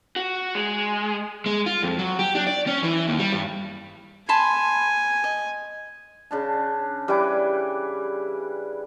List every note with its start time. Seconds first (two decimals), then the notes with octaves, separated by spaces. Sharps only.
0.16 F#4
0.55 G#3
1.46 G#3
1.66 F4
1.82 F2
1.99 F#3
2.19 G4
2.35 D4
2.47 D5
2.67 C#4
2.83 E3
3.08 D#2
3.19 G3
3.32 G2
4.29 G#5 A5 B5 C6
5.24 D#5
6.31 C#3 D4 A5
7.08 E3 G3 B4 G#5 D6